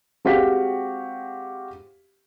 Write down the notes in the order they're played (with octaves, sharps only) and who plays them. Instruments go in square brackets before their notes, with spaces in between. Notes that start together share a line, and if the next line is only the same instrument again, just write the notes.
[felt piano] G#3 C4 F#4 G4 F5 B6